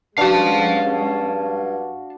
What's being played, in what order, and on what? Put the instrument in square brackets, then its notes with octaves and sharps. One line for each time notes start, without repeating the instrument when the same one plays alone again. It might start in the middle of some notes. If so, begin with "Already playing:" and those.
[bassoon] G2 [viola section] G#3 C#4 [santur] D4 F#4 [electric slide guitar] F5 A5